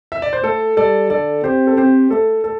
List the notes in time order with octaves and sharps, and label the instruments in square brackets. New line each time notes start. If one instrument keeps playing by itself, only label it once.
[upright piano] E5
D5
C5
[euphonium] A3 [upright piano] A4
[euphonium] G3 [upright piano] A4 D5
[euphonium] D3 [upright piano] A4 D5
[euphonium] C4 [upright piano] G4 C5
[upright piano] A4
[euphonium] C4 [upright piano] G4 C5
[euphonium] A3 [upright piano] A4
[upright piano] A4